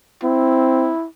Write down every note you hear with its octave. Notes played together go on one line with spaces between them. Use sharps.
C4 E4